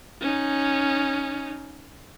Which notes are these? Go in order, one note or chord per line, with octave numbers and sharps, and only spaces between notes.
C#4 D#4